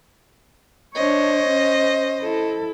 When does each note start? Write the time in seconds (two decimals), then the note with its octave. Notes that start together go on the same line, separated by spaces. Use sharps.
0.95 D4 C5 C#5 D#5
1.49 C#4
2.21 E4 A4